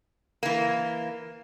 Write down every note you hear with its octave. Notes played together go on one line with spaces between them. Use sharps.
E3 A#3